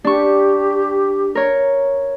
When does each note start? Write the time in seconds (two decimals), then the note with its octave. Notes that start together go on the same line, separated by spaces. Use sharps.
0.04 D4 G4 C#6
1.35 A#4 C#5